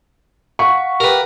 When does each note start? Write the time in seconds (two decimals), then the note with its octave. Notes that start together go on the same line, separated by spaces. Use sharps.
0.59 F5 F#5 C#6 B6
1.00 G4 A#4 B4